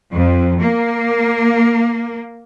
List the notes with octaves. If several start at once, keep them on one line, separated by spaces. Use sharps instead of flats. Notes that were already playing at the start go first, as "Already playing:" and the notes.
F2
A#3